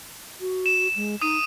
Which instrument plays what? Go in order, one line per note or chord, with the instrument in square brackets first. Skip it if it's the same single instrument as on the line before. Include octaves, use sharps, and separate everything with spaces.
[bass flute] F#4
[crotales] E7
[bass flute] G#3
[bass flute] D#4 [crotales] D#6 D#7